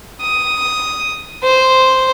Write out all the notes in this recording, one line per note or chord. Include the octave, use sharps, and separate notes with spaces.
D#6
C5